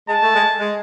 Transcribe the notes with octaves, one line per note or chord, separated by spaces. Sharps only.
G#3 A5
A3
G#3
G#3